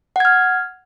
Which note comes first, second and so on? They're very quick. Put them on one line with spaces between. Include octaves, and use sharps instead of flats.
F#5 G#6 F6